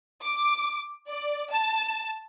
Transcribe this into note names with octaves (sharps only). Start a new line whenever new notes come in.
D6
D5
A5